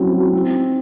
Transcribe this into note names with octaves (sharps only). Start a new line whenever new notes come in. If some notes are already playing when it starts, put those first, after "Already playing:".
Already playing: F#3 C4 C#4 E4
F#3
C4
D#4